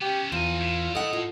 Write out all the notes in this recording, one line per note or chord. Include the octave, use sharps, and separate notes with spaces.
B3 C#4 G4
E2 C4 F4 G#5
A2
A4 D#5 F#5
F4